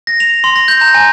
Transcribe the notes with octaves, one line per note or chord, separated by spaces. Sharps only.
A#6
F7
C6
A#6
G6
A#5
G#5